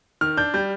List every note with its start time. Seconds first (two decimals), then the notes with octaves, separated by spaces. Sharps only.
0.21 D#3 F6
0.37 D4 G6
0.54 G3 G6